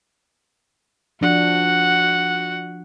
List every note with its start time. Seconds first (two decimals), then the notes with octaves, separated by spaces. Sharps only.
1.21 F3 D4 F#4 F#5